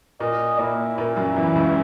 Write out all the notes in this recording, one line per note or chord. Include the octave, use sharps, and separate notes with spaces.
A#2 A#3 D#5
A#2 A#3 E4
A#2 A#3 E4
F#2 F#3
E2 E3 E4
C#2 C#3